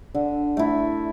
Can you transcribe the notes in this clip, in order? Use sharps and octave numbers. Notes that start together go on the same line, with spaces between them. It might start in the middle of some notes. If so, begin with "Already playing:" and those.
D3
A3 E4